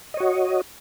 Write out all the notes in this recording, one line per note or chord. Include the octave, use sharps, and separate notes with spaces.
F#4 C#5 D#5